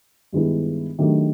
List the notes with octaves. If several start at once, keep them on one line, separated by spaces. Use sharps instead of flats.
G2 D#3 G#3 B3 E4
D#3 F#3 A3 D4 G4